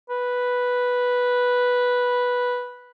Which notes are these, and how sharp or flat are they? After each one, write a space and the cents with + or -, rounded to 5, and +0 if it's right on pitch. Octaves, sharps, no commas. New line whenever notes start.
B4 -5